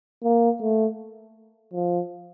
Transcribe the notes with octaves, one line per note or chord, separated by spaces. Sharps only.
A#3
A3
F3